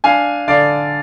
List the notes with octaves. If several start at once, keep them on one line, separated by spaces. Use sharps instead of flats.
D4 F5 G#5
D3 D5 F5